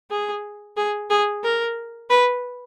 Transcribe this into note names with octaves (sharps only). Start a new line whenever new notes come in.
G#4
G#4
G#4
A#4
B4